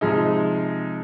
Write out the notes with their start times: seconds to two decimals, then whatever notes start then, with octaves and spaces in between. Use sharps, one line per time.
0.01 C3 F3 G#3 D#4